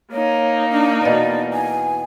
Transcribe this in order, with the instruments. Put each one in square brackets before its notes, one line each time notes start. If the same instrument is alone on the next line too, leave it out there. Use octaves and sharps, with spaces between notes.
[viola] A#3 D#4 [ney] C#5
[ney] D4
[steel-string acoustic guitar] E2 B2 [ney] D5
[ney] G#5